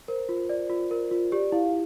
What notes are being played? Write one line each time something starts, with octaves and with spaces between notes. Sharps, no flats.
A#4 C5
F4
D5
F4
A#4
F4
G4 D5
E4 F5